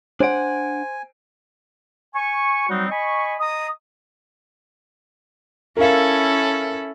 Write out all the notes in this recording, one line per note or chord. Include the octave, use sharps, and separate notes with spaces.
D4 C5 F#5 G#5 D7
G#5 C#6
F#3 G3 C4 D#4 F#4
D#5 G#5 B5 C#6
D#5 A#5 D#6
C#4 E4 A4 A#4 F5